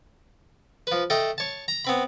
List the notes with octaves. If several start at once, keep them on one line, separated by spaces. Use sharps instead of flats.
F3 B4
A3 A4 D#5 G5
C#5 A5
A#5
B3 C4 B5